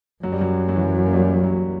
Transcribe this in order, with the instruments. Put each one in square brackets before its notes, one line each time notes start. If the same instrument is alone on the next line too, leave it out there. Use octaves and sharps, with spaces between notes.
[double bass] F#2 [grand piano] F#3
[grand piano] G3
F#3
F#3
E3
F#3
A#3
G3
F#3